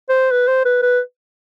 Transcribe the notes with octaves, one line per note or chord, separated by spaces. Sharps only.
C5
B4
C5
B4
B4